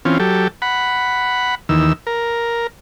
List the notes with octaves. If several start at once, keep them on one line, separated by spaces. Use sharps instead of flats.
E3 C4 C#4 F4
F#3 G4 A4
F#5 B5
D#2 D#3 E3 E6
A#4